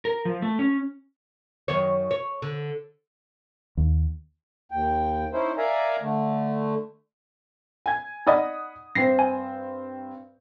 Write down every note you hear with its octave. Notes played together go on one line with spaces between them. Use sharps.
A#4
F3
A3
C#4
F#2 D#3 C#5
C#5
D3
D#2
D#2 G5
C#4 D#4 E4 C5
A#4 D5 E5 F5 G#5 A#5
D3 A3
G#5 G#6
D#4 D5 D#5 F#5 B5 D#6
G2 C4 C5 A#6 C7
G#5